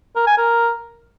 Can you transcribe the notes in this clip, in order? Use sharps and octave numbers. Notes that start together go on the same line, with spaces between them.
A#4
G#5
A#4